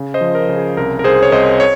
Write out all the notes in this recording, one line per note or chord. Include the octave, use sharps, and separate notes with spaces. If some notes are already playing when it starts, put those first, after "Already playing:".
Already playing: C#3
C5 D#5
F3
A#4
C#3
G#4
C2 A#4
A#4
C2 G#4 C5
C#5
C2 C5 D#5
C#5